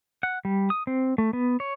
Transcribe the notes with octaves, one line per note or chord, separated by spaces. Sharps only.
F#5
G3
D#6
C4
A3
B3
C#5